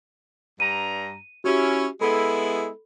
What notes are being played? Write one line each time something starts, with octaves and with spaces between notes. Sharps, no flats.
G2 A#5 D#7
C#4 E4 F#4 G4
G#3 B3 E4 A4 B5